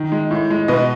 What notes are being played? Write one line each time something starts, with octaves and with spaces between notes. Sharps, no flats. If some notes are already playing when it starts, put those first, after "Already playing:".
Already playing: D#3
G#3
A2
G#3
B2 B4 D#5